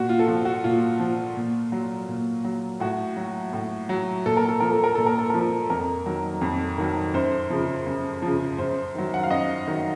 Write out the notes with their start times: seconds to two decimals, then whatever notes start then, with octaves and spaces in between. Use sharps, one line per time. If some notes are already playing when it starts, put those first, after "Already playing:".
Already playing: A#2 F#4
0.09 F4
0.19 A4
0.28 F3 F#4
0.45 F#4
0.64 A#2 F4
1.00 F3
1.37 A#2
1.72 F#3
2.08 A#2
2.44 F#3
2.80 A2 F#4
3.16 F#3
3.53 A2
3.89 F#3
4.26 A#2 A4
4.37 A#4
4.49 A4
4.60 F3 A#4
4.72 A4
4.84 A#4
4.95 A#2 A4
5.06 A#4
5.19 A4
5.30 F3 A#4
5.41 A4
5.70 F2 A#4
6.06 D#3 F#3
6.41 F2
6.78 D#3 F#3
7.14 F#2 C5
7.50 C#3 F3
7.86 F#2
8.22 C#3 F3
8.58 F#2 C5
8.95 D#3 F#3
9.14 F#5
9.23 F5
9.30 F#2 D#5
9.67 D#3 F#3